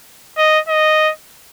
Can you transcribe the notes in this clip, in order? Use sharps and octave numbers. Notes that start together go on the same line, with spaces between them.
D#5
D#5